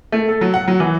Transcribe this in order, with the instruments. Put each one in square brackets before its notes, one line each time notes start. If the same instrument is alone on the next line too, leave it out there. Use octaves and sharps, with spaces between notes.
[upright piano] A3
A4
F#3
F#5
F#3
E3